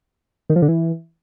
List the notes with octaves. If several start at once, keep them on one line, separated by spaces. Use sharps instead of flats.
D#3
F3
D3
E3